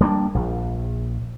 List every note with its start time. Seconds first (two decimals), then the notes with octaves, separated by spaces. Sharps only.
0.01 G3 A#3 C4 D4
0.35 A#1